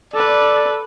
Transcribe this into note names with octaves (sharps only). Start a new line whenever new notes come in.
A4 B4 D5